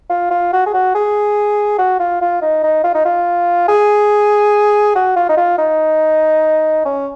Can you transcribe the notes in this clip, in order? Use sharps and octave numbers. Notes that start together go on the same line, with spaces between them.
F4
F4
F#4
G#4
F#4
G#4
F#4
F4
F4
D#4
D#4
F4
D#4
F4
G#4
F#4
F4
D#4
F4
D#4
C#4